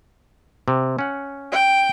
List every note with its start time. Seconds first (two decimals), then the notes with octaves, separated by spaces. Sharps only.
0.68 C3
0.99 C#4 F#5
1.52 G5